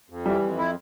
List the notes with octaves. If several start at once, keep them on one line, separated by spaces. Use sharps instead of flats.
F2
E3 G3
F2
E4